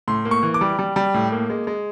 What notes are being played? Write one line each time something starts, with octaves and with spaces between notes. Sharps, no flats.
A2 C6
A#3
C#6
E3
D6
G3
G3
G3
A2
A#3
G#3
G#3